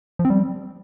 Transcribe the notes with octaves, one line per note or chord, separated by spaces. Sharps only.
F3
C4
G3